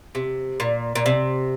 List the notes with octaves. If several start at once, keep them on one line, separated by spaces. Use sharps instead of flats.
C3
A#2
A#2
C3